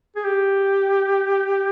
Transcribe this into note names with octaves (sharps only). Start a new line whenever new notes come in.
G#4
G4